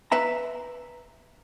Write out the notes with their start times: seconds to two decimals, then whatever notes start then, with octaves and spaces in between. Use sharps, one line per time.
0.12 B4 E5 A#5